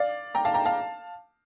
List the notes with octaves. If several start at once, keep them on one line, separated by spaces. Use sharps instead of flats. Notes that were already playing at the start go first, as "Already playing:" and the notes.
Already playing: D5 F5
G5 A#5
F5 A5
G5 A#5
F5 A5